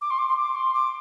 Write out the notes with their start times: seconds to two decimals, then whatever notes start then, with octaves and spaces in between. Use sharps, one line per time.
0.01 D6
0.10 C6
0.18 D6
0.28 C6
0.36 D6
0.55 C6
0.74 D6